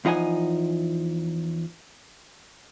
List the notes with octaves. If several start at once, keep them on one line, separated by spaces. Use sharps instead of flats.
E2 F3 D#4 F#5 G#5